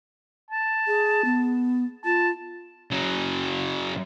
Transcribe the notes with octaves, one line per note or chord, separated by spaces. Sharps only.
A5
G#4
B3
F4 A5
C#3 F#3